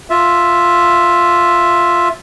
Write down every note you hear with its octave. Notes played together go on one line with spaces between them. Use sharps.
F4 E5